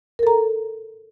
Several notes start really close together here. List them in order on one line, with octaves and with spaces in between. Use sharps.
A#4 A4 A#5